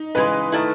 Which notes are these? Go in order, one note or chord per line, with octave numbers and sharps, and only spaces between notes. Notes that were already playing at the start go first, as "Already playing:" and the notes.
Already playing: D#4
C#3 E3 G#3 B4
D#3 A3 E4